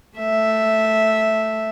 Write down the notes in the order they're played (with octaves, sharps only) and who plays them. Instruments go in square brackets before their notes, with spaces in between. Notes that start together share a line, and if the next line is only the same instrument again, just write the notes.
[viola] A3 E5